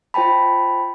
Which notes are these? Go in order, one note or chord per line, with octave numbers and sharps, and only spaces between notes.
F4 C5 G5 A5 B5